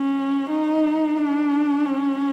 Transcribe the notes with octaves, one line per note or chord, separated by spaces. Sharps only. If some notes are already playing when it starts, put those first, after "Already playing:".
Already playing: C#4
D#4
D4
C#4